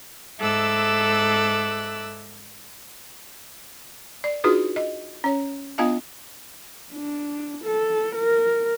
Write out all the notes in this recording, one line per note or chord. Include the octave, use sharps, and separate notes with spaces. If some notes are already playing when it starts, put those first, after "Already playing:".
G#2 A4 E5 D6 E6 F#6
D5
D4 D#4 F4 F#4 G#4 B4
D#5
C#4 C#5
B3 D4 F4 D#5 F5 A5
D4
A4
A#4